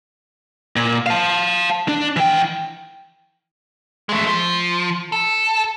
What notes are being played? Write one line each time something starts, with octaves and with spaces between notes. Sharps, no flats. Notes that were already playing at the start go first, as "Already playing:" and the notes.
A#2
F5 A5
D4
E3 G5
G#3 A3
F3
A4